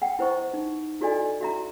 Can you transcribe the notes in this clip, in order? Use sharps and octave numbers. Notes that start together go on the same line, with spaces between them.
F#5 G5
E4 B4 C5 D#5 C#6
D#4
E4 F#4 A4 D5 D#5 G#5
F#4 E5 A#5